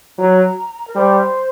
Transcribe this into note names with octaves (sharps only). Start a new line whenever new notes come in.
F#3 A#5
A#4
G3 C5